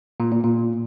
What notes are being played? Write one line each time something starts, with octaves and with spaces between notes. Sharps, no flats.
A#2
A#2
A#2